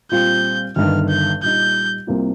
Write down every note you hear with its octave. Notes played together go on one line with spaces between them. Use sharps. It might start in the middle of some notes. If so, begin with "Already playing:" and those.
A#2 G3 C4 F4 G6
G1 G2 D#3 F6
G6
A#2 G3 D#4 G6
C2 C3 G3 A#3 F4